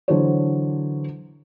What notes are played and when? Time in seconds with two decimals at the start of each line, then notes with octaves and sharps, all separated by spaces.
0.08 D3 E3 F#3 A4 C5 C#5